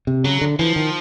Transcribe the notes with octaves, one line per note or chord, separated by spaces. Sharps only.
C3
C#3 F#3
D3
E3 F3
D#3